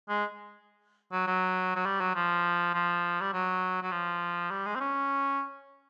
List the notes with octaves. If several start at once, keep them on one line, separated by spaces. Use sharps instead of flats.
G#3
F#3
F#3
F#3
G3
F#3
F3
F3
G3
F#3
F#3
F3
G3
G#3
C4
C#4